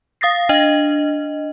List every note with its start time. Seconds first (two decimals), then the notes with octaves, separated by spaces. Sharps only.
0.21 F5 D#6 A6 A#6 C7
0.49 D4 D#5